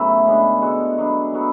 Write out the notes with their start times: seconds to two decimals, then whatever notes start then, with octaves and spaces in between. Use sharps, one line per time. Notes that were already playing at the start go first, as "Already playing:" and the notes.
Already playing: C#3 F#3 A3 B3 E4 A4
0.26 C#3 G#3 B3 D4
0.62 G#3 B3 F#4 A4
0.98 F#3 B3 D4
1.33 F#3 B3 F#4 A4